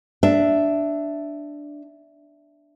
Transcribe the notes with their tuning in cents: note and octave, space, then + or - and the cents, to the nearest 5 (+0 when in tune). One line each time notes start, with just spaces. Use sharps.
D4 +0 E5 +0